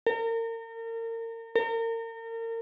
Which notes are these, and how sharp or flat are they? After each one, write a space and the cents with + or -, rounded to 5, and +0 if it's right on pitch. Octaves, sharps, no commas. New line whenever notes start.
A#4 -35
A#4 -35